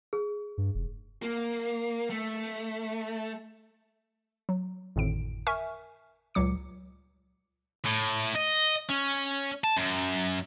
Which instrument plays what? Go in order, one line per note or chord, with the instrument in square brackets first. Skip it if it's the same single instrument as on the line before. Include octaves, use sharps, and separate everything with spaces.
[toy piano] G#4
[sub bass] G2
F1
[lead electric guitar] A#3
A3
[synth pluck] F#3
G#1 F2 A2 D3 D7
A#4 E5 G#5 C#6 F6
C#2 A#2 F#3 D6 C#7
[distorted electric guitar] A2
D#5
C#4
A5
F#2